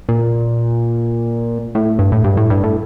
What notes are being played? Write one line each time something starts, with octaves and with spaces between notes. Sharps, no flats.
A#2
A2
G2
A2
G2
A2
G2
A2